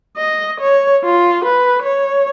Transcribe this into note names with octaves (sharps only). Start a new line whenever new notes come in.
D#5
C#5
F4
B4
C#5